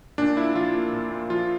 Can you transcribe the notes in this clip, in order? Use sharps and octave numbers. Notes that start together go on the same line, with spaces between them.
A#2 D4
A#2 E4
F3 F4
A#3
A#2
A#2
F3 F4